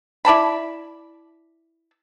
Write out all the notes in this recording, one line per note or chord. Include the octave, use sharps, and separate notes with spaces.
E4 D5 A5 B5